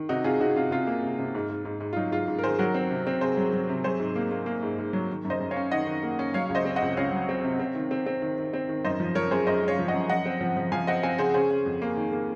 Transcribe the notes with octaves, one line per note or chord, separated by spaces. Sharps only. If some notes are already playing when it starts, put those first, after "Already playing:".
Already playing: D#3
C3 D#4 F#4
C3 F4 G#4
C3 D#4 F#4
C3 F4
C3 F4
A#3
C3
C3
G#2
G#2
G#2
G#2
F4
F#3 D#4
G#2 F4
G#2
A#4
D#3 G#4 C5
F#3 F#4 A#4
C4
C3
C4
C3 G#4 C5
F#3
F#3
C3
F#3 G#4 C5
G#2
A#3
A#3
A#3
G#2
G#2
F#3
D#3
F#2
C5 D#5
F#2
C#5 F5
C#4
D#3 D#5 F#5
D#3
A#3
C#4
F#3 C#5 F5
C#2 F5
C5 D#5
C4
D#5 F#5
C#2
C#2 C#5 F5
F#3
C4
C3
C4
D#3
C4
C4
D#3
D#3
C4
D#3
F#2 C5 D#5
F3
F3 A#4 C#5
F#2 G#4 C5
F#2 C5 D#5
G#3
C#5 F5
F3
D#5 F#5
F#2
F3 D#5 F#5
C4
F3
F3
F3 F5 G#5
C4 D#5 F#5
C4 F5 G#5
C#3 G#4 C5
C#4 G#4 C5
C#4
F2
A#3
D#3
A#3